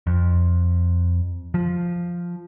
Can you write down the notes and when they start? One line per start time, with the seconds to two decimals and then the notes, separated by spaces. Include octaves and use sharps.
0.07 F2
1.54 F3